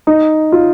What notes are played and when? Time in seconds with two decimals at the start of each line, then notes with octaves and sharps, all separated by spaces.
0.07 D#4
0.52 F4